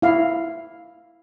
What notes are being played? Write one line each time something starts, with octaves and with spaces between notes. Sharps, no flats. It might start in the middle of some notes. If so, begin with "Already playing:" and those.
E4 F5